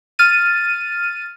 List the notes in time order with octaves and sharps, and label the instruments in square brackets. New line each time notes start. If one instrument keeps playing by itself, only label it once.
[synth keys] F6 A6 D#7